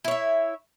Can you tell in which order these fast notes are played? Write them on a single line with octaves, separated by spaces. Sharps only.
E4 C#5 E5